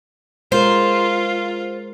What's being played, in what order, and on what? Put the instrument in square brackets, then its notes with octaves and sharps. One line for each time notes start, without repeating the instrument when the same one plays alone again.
[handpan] G#3 A#4 [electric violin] F4 [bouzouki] C5